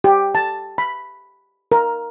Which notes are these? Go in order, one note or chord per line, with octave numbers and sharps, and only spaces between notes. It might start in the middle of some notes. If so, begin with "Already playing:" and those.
G4
A5
B5
A#4